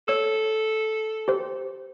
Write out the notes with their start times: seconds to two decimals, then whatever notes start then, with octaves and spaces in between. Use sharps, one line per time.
0.08 A4 C#5 E6
1.28 G4 C5